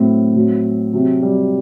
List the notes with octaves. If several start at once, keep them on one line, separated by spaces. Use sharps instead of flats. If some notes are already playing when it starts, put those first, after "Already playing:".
Already playing: A2 F#3 C4
A2 F#3
C3 F#3
G3